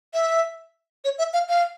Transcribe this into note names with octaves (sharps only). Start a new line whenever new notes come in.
E5
C#5
E5
F5
F5